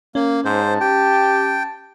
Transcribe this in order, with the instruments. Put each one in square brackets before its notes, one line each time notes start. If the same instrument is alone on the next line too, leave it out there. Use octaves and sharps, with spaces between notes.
[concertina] A#3 [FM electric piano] C#4
[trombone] G#2 [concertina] C5 [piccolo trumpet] A5
[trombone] G4 [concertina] G5